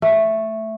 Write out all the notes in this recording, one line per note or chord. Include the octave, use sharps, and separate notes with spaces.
A3